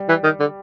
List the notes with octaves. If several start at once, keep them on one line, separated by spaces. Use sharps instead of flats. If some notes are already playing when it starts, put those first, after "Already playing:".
Already playing: G3
E3
D#3
D3